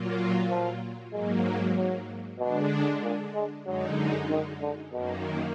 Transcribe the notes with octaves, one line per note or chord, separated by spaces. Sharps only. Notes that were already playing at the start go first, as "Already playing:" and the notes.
Already playing: A#2 F#3 A#3 F4
F3
G#2 F#3 G#3 A#3
F#3
B2 D3 G#3 D4
A#2
G#3
F#2 D3 F#3 G#3 D#4
D#3
D3
F#2 B2 D#3 A#3